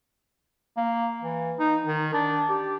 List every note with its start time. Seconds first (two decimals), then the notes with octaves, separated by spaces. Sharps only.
0.77 A#3
1.22 E3
1.59 D#4
1.86 D#3
2.13 D4
2.50 G4